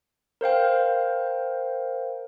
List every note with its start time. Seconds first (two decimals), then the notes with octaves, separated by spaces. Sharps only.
0.41 A#4 C5 F5 G5